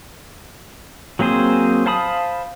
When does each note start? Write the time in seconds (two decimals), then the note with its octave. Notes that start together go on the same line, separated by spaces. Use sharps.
1.19 F#3 A#3 C4 G#4 C5
1.86 C5 F5 A5 B5 D#6